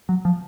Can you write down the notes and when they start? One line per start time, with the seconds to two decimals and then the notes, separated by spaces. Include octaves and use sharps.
0.09 F#3
0.25 F3